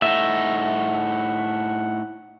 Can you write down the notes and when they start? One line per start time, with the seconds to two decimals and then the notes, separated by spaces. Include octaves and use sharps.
0.02 A2 D#4 E5 F#5